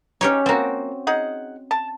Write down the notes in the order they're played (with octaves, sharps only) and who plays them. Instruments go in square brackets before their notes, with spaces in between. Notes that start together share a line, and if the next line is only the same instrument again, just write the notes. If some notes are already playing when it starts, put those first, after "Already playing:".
[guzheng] C#4 G4 C#5 [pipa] D#4
[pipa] F3 A#3 [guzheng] C4 F#4
[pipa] D#4 G#4 F#5
A5